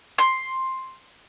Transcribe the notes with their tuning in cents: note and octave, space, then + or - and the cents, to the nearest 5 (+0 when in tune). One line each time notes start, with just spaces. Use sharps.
C6 +5